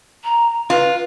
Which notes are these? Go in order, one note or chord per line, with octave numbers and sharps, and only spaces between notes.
A#5
F4 B4